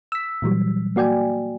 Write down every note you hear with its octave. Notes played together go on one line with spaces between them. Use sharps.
E6 B6
A#2 E3 F#3 G3
A#3 F#4 D5 G5 G#5